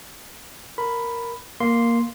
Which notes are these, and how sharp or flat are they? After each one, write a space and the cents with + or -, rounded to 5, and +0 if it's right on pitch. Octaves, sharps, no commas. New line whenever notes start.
A#4 +0 B5 +5
A#3 +0 C6 +0